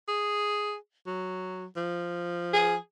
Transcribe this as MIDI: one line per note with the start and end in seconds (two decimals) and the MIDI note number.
0.08 0.75 68
1.07 1.65 54
1.77 2.76 53
2.53 2.76 68